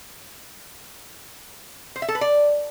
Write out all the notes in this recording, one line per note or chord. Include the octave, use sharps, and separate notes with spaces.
C5
E5
A4
B4
D5